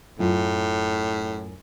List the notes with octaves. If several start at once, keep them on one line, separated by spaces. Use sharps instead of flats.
F#2 A2 F4